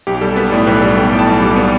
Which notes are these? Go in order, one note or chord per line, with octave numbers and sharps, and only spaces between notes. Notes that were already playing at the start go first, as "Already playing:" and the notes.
B1 G4
G3 A4
B3 B4
A2 D5
B1 B4
G3 A4
B3 G5
A2 G5
A5
B1
G3 D6
B3